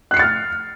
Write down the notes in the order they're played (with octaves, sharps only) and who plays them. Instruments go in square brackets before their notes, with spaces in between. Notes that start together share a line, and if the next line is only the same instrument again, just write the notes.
[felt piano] F#6
C7
C#7
A6
F6